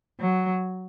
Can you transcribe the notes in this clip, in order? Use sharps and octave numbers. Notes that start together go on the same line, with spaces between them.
F#3